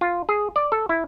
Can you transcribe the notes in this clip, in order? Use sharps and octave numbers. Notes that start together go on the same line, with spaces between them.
F4
G#4
D5
A4
E4